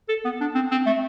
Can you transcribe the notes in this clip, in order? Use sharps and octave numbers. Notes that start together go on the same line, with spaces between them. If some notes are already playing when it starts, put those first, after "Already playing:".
A4
B3
D4
C4
C4
A3